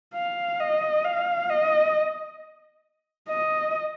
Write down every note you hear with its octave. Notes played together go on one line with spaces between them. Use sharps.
F5
D#5
F5
D#5
D#5